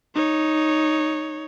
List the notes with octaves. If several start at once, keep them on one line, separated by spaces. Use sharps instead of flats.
D#4 C#5